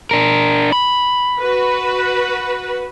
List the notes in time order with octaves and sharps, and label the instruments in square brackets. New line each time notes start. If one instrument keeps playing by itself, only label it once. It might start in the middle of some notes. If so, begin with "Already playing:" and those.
[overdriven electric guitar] D4 A#4
B5
[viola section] F#4 B4